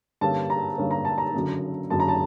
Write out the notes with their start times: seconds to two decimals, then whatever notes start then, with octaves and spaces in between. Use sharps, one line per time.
0.21 G2 D3 G3 A#3 C#4 A5
0.50 A#5
0.78 G2 D3 G3 A#3 C#4
0.91 A#5
1.05 A5
1.18 A#5
1.34 F#1 F#2 D3
1.90 F#1 F#2 D3 A5
2.00 A#5
2.08 A5